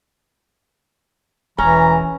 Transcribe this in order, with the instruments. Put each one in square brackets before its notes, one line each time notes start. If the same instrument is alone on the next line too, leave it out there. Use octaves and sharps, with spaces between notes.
[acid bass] E1 [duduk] E3 [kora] C#4 [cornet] A#5